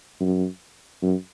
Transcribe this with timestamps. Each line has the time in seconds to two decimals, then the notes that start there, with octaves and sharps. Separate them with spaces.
0.21 F#2
1.02 F#2